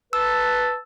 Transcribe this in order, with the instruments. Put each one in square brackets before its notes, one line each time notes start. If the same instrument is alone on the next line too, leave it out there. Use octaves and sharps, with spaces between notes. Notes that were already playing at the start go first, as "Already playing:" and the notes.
[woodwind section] B4 A5 [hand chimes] E6